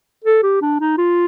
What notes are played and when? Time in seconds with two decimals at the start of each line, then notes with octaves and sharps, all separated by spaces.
0.24 A4
0.43 G4
0.62 D4
0.80 D#4
0.98 F4